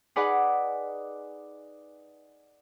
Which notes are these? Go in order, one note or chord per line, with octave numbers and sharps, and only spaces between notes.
D#4 G#4 B4 D5 F#5